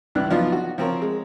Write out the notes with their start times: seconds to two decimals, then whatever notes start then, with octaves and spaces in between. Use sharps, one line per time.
0.15 C#2 G2 E3 D4 F#6
0.30 F3 F#3 B3 D4 D#4 F4
0.52 F#4
0.78 F3 C4 A#4 C#5
1.02 G#3